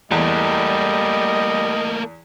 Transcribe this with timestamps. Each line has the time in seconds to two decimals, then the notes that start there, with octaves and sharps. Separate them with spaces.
0.12 E2 G3 A3 A#3 D#5